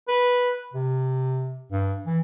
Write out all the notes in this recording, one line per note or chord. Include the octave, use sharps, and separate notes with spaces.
B4
C3
G2
E3